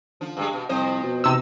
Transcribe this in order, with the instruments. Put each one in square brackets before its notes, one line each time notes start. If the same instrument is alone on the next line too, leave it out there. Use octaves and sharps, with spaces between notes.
[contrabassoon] D3 [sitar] F3
[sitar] G2 G#3
B2
[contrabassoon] C2 [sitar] F2 C5 D#5
[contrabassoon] B2
[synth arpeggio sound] C3 E6 [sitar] D#4